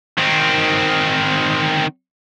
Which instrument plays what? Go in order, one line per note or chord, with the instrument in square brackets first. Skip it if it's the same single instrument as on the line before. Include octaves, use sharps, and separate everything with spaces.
[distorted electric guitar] D#3 C4